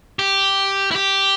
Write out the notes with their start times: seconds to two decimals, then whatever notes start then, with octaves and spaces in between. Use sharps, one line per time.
0.19 G4
0.91 E4
0.96 G4